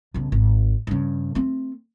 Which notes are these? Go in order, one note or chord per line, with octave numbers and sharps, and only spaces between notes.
B1 C#3
G#1
G2 C#3
A3 C4